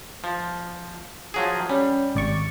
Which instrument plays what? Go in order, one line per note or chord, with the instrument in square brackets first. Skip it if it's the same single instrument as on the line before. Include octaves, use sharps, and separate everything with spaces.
[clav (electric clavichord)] F3
F3 F#3 G#4
[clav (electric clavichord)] G3 [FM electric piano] C#4
[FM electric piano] G#1 D5 C#6